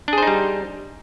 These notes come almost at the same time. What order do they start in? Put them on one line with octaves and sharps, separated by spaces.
D4 G#4 C5 D#4 G3